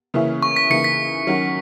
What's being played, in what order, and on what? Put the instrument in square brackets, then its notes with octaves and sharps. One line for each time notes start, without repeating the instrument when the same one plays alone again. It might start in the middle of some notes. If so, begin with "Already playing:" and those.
[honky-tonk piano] C#3 E3 A#3 C#4 E4
[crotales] C#6
B6
[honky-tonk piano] C#3 E3 A#3 D#4 [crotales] C#7
[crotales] B6
[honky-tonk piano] D#3 F#3 C#4 F#4